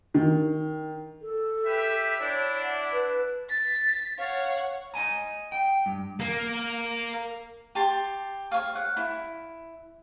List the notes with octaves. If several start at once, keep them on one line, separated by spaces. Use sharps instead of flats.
D#3
A4
G4 B4 E5
D4 E4 C#5
F#5
B4
A6 B6
C#5 F5 F#5
D#5 G#5 A#5
G5
G2
A#3
G4 A5 C6
C#5 F5
F#5
E4